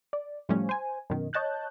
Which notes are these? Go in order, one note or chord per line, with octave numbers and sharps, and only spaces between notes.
D5
A2 F3 G3 A3 C#4
C5 G#5
F#2 B2 D#3
C#5 D#5 A5 F#6 G6